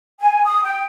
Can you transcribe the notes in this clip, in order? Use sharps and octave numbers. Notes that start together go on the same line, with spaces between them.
G#5
D#6
G5